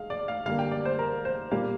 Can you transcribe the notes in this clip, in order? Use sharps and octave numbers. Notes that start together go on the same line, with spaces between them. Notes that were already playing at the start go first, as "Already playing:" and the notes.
Already playing: G#3 F5
D5
F5
D3 G3 A#3 F5
G5
D5
C5
A#4
C5
A#2 G3 A#3 F5